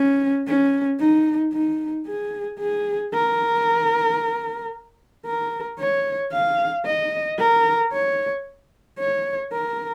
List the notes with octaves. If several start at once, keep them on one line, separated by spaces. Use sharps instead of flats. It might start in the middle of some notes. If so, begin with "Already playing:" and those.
Already playing: C#4
C#4
D#4
D#4
G#4
G#4
A#4
A#4
C#5
F5
D#5
A#4
C#5
C#5
A#4